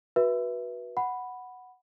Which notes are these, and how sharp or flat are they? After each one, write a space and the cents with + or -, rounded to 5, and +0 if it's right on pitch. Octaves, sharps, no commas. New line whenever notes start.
F#4 +0 B4 -20 E5 +0
F#5 +0 B5 +0